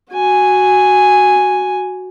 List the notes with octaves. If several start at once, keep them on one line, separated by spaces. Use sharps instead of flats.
F#4 G#5